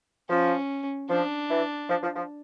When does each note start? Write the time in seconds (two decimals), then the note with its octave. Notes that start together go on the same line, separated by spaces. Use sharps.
0.30 F3 C#4
1.10 F3 D4
1.50 E3
1.90 F3
2.03 F3
2.16 F3